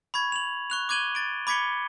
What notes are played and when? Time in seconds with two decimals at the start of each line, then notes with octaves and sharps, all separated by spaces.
0.14 B5 C#6 G#6
0.32 F7 F#7
0.70 C#6 F#6 F7
0.89 D6 F#6 G#6 D#7 F#7 G7
1.15 A6 D7
1.47 B5 D6 G#6 B6 C#7 G7